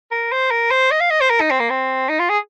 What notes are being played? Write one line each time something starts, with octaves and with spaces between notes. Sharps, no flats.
A#4
C5
A#4
C5
D#5
F5
D#5
C5
A#4
D#4
C4
A#3
C4
D#4
F4
G#4